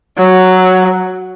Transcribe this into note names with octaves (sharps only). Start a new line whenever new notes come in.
F#3